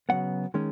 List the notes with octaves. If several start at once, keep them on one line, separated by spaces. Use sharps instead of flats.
C#3 F#3 B3 F#5
D#3 G#3 C#4